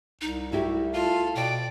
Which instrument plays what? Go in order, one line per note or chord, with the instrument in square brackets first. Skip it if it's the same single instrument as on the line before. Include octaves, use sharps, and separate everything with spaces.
[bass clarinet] C2 [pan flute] D#4
[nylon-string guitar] A3 E4 G4 [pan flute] F#4
[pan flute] F4 [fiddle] A4 F5
[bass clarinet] B2 [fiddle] D5 [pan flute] G5